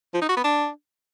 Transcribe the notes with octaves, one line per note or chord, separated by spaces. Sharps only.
F3
D#4
F#4
B3
D4